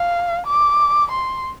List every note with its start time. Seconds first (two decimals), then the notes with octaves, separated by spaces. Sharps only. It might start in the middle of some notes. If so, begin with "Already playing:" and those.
Already playing: F5
0.46 D6
1.12 C6